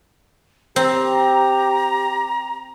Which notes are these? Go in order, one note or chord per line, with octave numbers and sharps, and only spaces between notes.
C4 G4 A#5